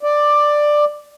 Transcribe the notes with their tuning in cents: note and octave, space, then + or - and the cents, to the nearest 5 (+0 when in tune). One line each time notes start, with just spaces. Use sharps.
D5 +10